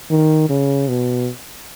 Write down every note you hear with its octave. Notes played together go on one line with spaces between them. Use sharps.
D#3
C#3
B2